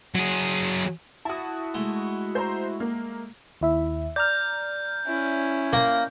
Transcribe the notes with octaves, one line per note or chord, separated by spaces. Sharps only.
F#3 G#4
E4 F#4 A5 D#6
G#3 A3
C5 A#5
A#3
D#2 E4 E5
D5 A#5 F6 G6
C#4 E4
A#3